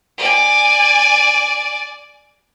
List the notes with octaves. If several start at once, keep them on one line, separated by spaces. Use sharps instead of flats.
D5 G#5